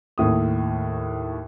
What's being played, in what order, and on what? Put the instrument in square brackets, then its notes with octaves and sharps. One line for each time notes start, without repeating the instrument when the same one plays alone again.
[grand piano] D#2 A2 D#6